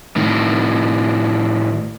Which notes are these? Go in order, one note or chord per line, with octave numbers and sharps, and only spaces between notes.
A2 D#3